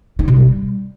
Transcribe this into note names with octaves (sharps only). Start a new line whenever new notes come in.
D#4
B2
G3